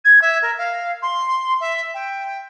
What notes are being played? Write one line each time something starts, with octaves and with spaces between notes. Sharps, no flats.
G#6
E5
A#4
F5
C6
E5
G5